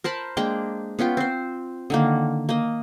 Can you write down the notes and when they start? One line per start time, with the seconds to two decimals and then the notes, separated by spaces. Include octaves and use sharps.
0.04 A#4 C5 A5 B5
0.37 G#3 A#3 D4 G5
0.99 B3 C#4 F4 G5
1.17 C4 C5
1.90 D3 D#3 A#3
2.49 A#3 D#5